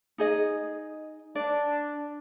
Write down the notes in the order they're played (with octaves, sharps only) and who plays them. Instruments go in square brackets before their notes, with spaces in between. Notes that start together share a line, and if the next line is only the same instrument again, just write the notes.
[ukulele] D#4 G#4 D#5
[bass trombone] D4 [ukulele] D5